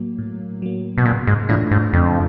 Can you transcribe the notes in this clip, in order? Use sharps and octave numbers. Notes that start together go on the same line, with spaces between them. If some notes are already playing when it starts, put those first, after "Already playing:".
Already playing: A2 F#3 A#3
A2
F#3 A#3
B2
A#2 C#3
G#2
A2 E3 A3 D4 F4
G#2
F2 C#3